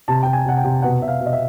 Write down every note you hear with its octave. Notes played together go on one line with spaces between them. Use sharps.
C3 A5
C3 G5
G#5
C3 F#5
G5
C3
B2 F#5
B2 E5
F5
B2
D#5
E5